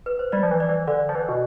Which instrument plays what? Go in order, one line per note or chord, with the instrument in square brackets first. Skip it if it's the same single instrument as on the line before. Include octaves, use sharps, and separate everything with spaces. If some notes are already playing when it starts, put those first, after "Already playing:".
[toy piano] B4
C5
[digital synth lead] G3 [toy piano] D5
[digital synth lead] F3
E3
[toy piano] D5
[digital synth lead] E3
[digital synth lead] D3 [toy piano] D5
[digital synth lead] F3
E3
B2